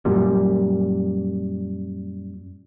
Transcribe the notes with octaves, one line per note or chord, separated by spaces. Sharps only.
F#2 A#2 G3